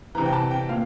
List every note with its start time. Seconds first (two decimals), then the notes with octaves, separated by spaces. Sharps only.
0.15 E3 A#5
0.18 C3
0.26 G5
0.33 A5
0.51 G5
0.69 A#2 F5